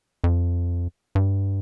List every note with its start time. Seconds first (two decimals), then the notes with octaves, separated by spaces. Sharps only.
0.24 F2
1.15 G2